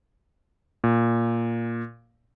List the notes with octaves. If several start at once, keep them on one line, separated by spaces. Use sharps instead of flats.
A#2